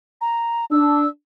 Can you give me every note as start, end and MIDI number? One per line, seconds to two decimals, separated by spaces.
0.21 0.65 82
0.71 1.04 62
0.71 1.08 88